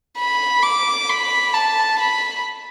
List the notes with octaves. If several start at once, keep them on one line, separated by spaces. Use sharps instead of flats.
B5
D6
B5
A5
B5